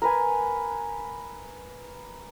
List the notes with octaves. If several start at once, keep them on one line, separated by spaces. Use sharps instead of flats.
A#4 B4 G#5